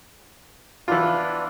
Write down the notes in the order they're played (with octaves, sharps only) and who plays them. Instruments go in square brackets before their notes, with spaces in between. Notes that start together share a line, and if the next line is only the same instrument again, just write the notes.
[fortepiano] E3 F4 [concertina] B3 D4